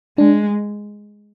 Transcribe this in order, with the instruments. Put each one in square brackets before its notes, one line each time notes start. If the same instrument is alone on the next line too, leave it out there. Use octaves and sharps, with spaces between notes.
[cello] G#3 [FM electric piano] D4